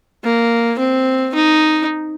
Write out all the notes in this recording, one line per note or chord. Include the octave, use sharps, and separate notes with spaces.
A#3
C4
D#4